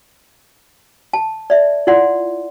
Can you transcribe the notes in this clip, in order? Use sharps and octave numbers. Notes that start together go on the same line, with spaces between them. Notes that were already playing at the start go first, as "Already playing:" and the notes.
A5
D5 E5
E4 F4 D5 F#5 C6